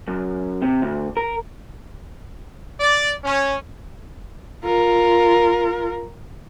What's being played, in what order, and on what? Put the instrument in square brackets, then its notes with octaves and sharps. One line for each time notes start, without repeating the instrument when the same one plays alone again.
[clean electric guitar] F#2
C3
D2
A#4
[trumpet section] D5
C#4
[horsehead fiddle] F4 A#4